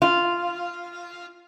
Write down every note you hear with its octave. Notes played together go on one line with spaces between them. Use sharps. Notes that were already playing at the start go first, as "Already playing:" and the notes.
F4